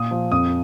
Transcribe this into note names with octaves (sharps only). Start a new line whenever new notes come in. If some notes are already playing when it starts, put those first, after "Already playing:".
Already playing: A#2 D#6
F3
F2 D#6